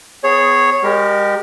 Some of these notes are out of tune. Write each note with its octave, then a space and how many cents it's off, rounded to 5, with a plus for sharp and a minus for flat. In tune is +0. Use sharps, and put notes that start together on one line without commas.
B3 +30 G#4 +0 C#5 -10
G#3 -35 G4 -10 A#4 +0